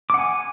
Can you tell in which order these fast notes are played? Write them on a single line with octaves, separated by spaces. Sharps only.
D6 F#5 G#5